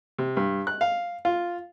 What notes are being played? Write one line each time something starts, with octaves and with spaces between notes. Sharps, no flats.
C3
G2
F#6
F5
F4